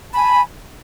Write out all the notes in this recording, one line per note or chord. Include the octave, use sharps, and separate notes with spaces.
G#5 A5 B5